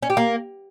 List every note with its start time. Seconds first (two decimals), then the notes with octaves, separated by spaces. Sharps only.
0.03 C#4
0.10 G4
0.17 A#3